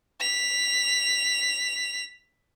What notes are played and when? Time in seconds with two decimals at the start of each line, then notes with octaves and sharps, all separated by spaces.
0.20 B6 F7